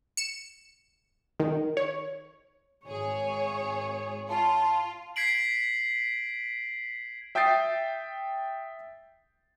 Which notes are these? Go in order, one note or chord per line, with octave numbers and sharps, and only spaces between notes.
C#7 E7
D#3
C#5
G#1 G#4 C#5
F4 A5
G#6 B6 C7 D7 F#7
E5 G5 D#6 G6 A6 C7